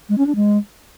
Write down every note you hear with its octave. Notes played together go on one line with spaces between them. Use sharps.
G#3
C#4
D4
G#3